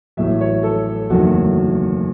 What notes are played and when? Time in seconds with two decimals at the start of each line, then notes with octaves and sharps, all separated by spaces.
0.17 A1 A2 F#3 E5
0.41 C#5
0.63 A4
1.10 F#1 E2 D#3 F#3 A3 F#4